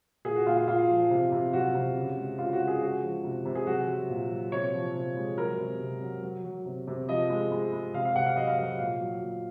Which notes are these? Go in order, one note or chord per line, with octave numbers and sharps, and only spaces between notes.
A#2 G#4
F#4
A#2 F4
F4
A#2 F4
F3
C3
C3
F#3 F#4
C3
C#3
G#3
C#3 F4
F#4
C#3
G#4
G#3 F#4
F3
C3
C3
G#4
F#3 F#4
F#3
A#2
F#3
C3 C#5
F3
C3
G#3
F#3 A#4
C3
C3
F#3
F#3
F#3
C3
C3
F3 D#5
G#3
G#3
G#3
C3 F5
F5
C3 F#5
F5
F#3 D#5
F5
F#3 F5
A#2 F5
F#3
A#2